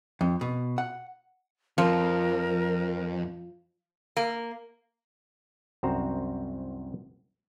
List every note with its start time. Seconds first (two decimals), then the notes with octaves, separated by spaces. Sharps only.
0.21 F2
0.41 B2
0.78 F#5
1.78 F2 F3 A#4
4.17 A#3
5.83 C2 F#2 C4 F#4 C5 A#5